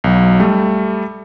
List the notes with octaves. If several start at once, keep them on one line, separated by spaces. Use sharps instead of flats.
B1 F#3
G3 A3